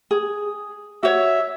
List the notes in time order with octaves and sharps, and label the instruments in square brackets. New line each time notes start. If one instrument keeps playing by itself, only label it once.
[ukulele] G#4
[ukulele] F#4 C#5 [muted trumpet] E5